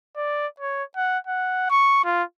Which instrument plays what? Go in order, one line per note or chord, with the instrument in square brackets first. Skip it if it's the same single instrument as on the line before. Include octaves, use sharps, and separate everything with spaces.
[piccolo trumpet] D5
C#5
F#5
F#5
C#6
F4